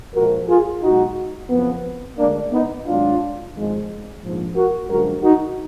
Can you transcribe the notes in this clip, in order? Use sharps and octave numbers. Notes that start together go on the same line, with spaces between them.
A#1 A#2 F3 G#3 F#4 A#4
F4 G#4
B1 B2 G#3 D#4 F#4
F#1 F2 F3 B3
D2 D3 G#3 A#3 D4
B3 D#4
G#1 G#2 F#3 D4 F4
G#1 G#2 F3 G#3
A#1 G#2 F3
F#4 A#4
F#2 D3 F3 G#3 F#4 A#4
D#4 F#4